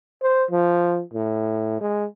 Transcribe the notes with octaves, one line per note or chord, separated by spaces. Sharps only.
C5
F3
A2
G#3